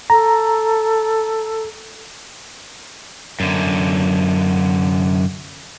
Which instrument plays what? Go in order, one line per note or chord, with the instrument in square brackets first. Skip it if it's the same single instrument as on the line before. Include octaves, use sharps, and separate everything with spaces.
[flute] A4 [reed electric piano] A#5
[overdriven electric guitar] F#2 D3